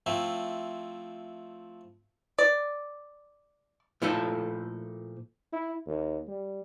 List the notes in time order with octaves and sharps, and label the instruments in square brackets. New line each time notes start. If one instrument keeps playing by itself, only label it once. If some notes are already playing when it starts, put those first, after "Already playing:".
[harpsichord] F3 A3 C4 E4
[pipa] D5
[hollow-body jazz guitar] A#2 F3 A3 E4 A4
[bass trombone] E4
D#2
G3